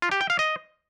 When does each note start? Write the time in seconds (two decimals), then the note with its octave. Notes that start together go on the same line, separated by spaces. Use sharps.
0.02 F4
0.11 G4
0.21 G5
0.30 F5
0.39 D#5